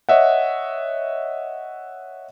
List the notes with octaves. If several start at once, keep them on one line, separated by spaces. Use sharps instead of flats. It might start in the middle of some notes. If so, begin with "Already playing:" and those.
C#5 D#5 E5 F#5